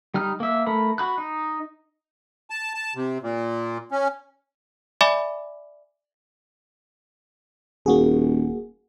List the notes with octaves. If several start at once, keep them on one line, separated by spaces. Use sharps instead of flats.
G3 D#4 F6
A#3 E5
A3 A#4 B5
F#4 B5 F#6
D#4
A5
A5
C3
A#2
C#4
D5 E5 G#5 B5 D6
D#1 A#3 F#4 G#4